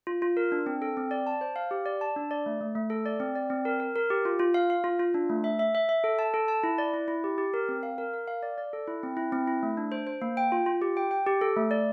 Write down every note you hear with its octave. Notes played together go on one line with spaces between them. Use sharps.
F4
F4
A#4
D4
C4
A4
C4
D5
A5
C5
F5
G4
D5
A5
D4
D5
A3
A3
A3
A4
D5
C4
D5
C4
A#4
A#4
A#4
G4
F4
F4
F5
F5
F4
F4
D4
A3
E5
E5
E5
E5
A4
A5
A4
A5
E4
D5
E4
E4
G4
G4
A#4
C4
F5
A#4
A#4
F5
D5
D5
A4
E4
C4
E4
C4
E4
A3
D4
C5
C5
A#3
G5
F4
F4
G4
G5
G5
G4
A4
A3
D5